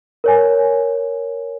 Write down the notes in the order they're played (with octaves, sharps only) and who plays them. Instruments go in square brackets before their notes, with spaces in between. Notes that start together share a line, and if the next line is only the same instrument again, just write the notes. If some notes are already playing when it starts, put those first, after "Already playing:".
[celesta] A#4 C#5 G#5